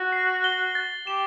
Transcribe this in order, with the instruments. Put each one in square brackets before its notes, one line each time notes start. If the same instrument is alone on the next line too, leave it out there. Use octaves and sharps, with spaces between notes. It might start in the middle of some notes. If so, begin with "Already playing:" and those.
Already playing: [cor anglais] F#4
[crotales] C7
G7
A6
[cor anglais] G4 [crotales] E7